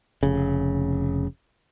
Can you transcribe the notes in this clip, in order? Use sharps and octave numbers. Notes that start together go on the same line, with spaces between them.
F1 C#3